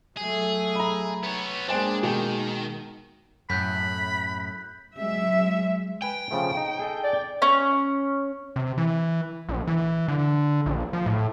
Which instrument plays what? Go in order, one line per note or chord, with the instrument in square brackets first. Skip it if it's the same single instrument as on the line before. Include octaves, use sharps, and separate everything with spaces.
[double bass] F#3 A3 [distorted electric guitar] G#4
[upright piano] A#5 B5
[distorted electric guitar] B3 C#5
[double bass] G#3 A#3 [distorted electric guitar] D4 [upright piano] C5 G5 G#5
[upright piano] B2 G5 [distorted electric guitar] D#3
[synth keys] F#2 A2 [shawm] B5 [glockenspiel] F#6 G6 B6
[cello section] F#3 G#3 E5
[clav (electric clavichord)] B4 G#5 [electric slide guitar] G5
[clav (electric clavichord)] C#3 F3 A3
D#4
G#4 A4 D#5
[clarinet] D5
[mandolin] C#4
[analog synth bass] C3
E3
A#1
E3
D3
A#1
F3
A2